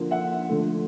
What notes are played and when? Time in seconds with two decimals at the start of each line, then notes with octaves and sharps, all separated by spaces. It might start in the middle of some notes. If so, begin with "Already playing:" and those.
Already playing: D3 F3 A#3
0.11 E5 F#5
0.49 D3 F3 A3